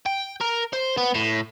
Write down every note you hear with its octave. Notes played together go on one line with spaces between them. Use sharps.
G5
A#4
C5
B3
A2